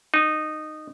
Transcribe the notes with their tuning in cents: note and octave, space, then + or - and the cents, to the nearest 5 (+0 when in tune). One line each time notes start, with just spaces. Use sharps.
D#4 -15